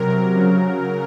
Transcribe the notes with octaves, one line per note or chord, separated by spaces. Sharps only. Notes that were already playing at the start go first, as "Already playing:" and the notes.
Already playing: C3 F#3 A#4
C#3 F#3